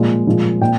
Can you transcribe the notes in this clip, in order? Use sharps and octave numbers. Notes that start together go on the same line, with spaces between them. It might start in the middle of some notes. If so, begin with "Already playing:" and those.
Already playing: A#2 F3 G#3
A#2 F3 G#3
A#2 G5